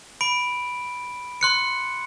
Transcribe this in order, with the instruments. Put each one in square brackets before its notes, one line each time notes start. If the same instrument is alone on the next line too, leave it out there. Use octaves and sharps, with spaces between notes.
[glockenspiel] B5 D7
C6 F#6 C#7